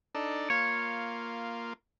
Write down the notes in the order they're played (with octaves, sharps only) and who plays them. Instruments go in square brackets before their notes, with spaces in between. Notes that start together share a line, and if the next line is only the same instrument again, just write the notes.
[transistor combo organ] D4 D#4 A4
[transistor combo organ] A#3 F4 [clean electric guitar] C#5